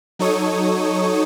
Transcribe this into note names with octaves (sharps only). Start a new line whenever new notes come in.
F#3 D#4 A4 C#5 C#6 D#6